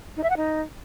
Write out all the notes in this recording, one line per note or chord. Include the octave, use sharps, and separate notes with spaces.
D#4
E5
F#5
D#4